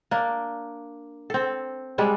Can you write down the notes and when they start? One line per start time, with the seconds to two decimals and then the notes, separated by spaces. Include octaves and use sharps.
0.11 A#3 D4
1.30 C4 A4
1.98 G3 G#3 D4